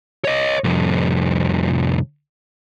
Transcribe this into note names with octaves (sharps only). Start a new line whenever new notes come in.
C#5 D#5
C2 F2